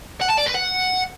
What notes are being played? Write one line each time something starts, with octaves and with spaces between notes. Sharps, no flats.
F#5
A5
D5
B4
F#5